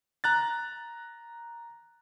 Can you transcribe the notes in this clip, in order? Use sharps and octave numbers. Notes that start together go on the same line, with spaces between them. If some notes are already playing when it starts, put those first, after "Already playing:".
A#5 F#6 A6